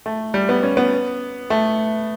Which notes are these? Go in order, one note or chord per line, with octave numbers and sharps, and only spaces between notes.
A3
G3
B3
C#4
B3
A3